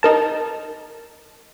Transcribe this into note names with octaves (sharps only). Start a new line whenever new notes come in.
D#4 A#4 A5